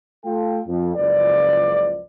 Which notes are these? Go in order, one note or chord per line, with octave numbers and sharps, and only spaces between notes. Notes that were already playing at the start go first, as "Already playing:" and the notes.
A3 F4 A4 G5
F2
F#1 C#2 F3 B4 D5